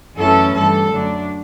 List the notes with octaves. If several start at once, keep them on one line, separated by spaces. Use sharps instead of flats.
F#2 E3 A3 C#4 E4 A4
G2 E3 G3 A4
F#2 D3 A3 D4